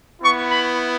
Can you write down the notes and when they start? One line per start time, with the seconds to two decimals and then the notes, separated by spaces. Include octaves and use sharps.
0.22 B3 E4 C#6
0.50 B5